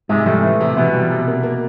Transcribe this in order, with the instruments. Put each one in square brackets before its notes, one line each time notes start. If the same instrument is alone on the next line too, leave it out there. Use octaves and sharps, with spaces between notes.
[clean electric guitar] G#2 G#3 [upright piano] C3
[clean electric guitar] A2 A3 [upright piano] G3
[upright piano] E3
C3
[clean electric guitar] B2 B3 [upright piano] E3
[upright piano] G3
C3
A#3
A#3